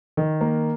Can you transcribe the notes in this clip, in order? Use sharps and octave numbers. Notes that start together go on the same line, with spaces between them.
D#3
A#3